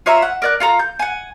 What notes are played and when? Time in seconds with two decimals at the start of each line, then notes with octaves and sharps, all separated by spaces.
0.06 F4 C#5 E5 A#5
0.22 F#5
0.42 A#4 D5 F#6
0.60 F4 A4 A#5
0.79 G6
0.99 F#5 G#5